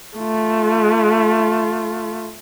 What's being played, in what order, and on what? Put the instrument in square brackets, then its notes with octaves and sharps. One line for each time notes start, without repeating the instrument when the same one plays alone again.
[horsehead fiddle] A3 F4